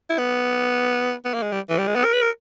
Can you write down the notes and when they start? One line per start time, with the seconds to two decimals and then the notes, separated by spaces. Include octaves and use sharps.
0.10 E4
0.18 B3
1.25 B3
1.34 A#3
1.42 G#3
1.52 G3
1.69 E3
1.78 G3
1.87 G#3
1.96 B3
2.04 A#4
2.13 B4
2.22 A#4